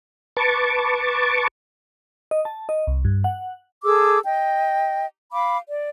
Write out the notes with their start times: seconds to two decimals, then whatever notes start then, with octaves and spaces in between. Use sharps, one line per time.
0.37 B4 A5 C#6 D6
2.31 D#5
2.45 A5
2.69 D#5
2.87 C2
3.05 G2
3.24 F#5
3.84 G#4 A4 D6 E6
4.24 D#5 G5
5.32 F5 B5 D6
5.68 D5